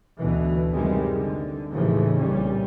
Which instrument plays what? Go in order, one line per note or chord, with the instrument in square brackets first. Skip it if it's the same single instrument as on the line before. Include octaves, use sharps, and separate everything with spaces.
[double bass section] D2 B2 E3
F#2 C3 D#3 G3 G#3
D3
D#2 A2 C#3 E3 F3
C2 A#2 G3 C#4